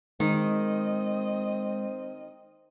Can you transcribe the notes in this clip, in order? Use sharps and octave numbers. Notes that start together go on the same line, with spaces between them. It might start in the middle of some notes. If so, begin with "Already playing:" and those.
D#3 G#3 C4 D#5